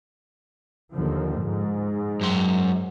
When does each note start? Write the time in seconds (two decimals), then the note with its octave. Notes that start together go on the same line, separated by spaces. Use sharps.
0.92 D#2 D3 F3
1.41 G#2
2.21 F#2 C6